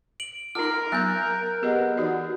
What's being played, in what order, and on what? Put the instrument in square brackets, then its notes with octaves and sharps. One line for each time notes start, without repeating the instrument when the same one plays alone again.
[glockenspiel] D7 F#7
[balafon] D#4 F4 [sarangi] A#4 [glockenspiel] F6
[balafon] F#3 B3 [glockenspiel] F#6 G6
[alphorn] B3 [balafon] G4 G#4 D#5
[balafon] E3 D#4 D5 [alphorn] F#4